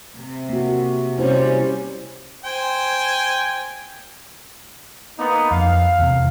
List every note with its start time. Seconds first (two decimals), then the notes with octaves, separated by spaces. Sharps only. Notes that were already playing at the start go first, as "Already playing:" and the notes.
0.16 C3
0.49 A#3 F#4
1.18 C3 G3 C#4 E4 C5
2.44 C5 G5 G#5
5.18 A#3 B3 D#4
5.51 F2 F5
5.99 E2 C3